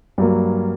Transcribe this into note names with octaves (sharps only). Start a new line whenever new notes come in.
G2 F#3 A#3